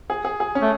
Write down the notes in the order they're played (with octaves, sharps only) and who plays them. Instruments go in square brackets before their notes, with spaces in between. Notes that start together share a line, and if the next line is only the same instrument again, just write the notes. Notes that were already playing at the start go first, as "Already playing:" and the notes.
[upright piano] G#4
G#4
G#4
C#4
[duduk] A3